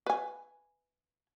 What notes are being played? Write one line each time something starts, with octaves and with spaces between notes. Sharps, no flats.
B4 G#5